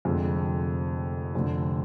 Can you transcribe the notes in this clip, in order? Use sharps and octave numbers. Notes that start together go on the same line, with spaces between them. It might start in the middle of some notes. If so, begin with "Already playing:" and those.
F1 F2 D3 G#3 C4
F1 F2 D3